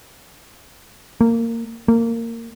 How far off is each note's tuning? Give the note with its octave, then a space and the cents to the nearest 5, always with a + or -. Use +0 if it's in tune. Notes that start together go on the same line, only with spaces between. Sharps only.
A#3 -20
A#3 -20